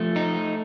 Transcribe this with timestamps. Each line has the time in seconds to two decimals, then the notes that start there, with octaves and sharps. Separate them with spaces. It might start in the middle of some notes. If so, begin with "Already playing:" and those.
Already playing: F3 A3
0.16 D#4